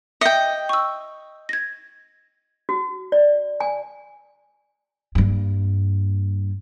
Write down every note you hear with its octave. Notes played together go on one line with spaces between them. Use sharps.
D#5 E5 G5 C#7
C#6 E6
G#6 A#6
F#4
D5
G#5
G2 A#3